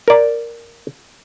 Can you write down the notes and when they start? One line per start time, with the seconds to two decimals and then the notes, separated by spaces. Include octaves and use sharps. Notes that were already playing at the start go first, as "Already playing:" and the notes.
0.08 A#4 D5